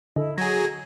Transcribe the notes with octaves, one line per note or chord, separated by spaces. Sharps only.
D3 E4 A4 D#5
F#3 G#4 F#5 A#5 G#6 A#6